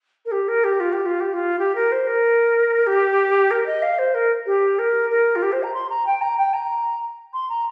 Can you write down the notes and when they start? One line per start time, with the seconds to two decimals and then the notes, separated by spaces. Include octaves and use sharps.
0.25 A#4
0.31 G4
0.48 A#4
0.63 G4
0.80 F4
0.92 G4
1.05 F4
1.20 G4
1.33 F4
1.58 G4
1.75 A#4
1.91 C5
2.06 A#4
2.86 G4
3.50 A#4
3.66 D#5
3.82 F5
3.98 C5
4.14 A#4
4.46 G4
4.78 A#4
5.10 A#4
5.35 F4
5.42 G4
5.51 C5
5.63 A#5
5.73 C6
5.89 A#5
6.06 G5
6.21 A#5
6.37 G5
6.53 A#5
7.33 C6
7.49 A#5